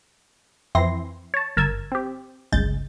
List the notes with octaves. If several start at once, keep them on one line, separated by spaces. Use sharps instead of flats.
F2 E3 C4 E4 C6 A#6
C#5 A5
G1 A#4 A5 E6 G#6
C4 G4
G1 C#2 G#3 G6 A6